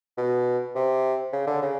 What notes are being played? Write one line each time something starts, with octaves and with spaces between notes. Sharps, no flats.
B2
C3
C#3
D3
C#3